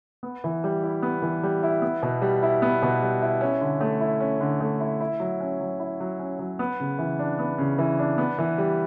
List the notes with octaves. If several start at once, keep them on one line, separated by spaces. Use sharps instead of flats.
B3
E3
G3
E4
B3
E3
G3
E4
B3
B2
G3
E4
B3
B2
G3
E4
C#4
D3
A3
E4
C#4
D3
A3
E4
E4
F#3
C#4
F#3
E4
F#3
C#4
F#3
B3
C#3
E3
D4
B3
C#3
E3
D4
B3
E3
G3